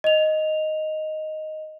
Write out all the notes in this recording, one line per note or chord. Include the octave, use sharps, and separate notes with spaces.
D#5 F7